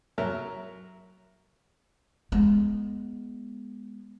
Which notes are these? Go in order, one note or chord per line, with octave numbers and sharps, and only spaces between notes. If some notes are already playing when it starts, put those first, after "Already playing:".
F#3 A#4 E5
G#3 B3